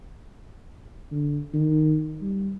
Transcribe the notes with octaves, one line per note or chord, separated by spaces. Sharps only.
D3
D#3
G3